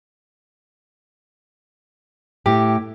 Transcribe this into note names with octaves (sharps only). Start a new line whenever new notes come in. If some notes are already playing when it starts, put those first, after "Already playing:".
A2 G4